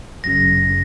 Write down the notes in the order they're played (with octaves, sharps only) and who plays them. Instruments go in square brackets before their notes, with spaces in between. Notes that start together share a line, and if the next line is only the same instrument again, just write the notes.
[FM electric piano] G1 F#2 C#3 [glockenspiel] A#6
[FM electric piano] C#3